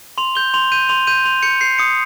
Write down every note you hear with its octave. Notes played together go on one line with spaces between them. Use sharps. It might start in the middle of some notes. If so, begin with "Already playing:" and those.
C6 F7
G6 G7
C6 F7
G6 D#7
C6 F7
G6 D#7
C6 F7
G6 C#7
G6 C7
D#6 C#7